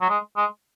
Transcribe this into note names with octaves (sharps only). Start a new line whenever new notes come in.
F#3
G#3
G#3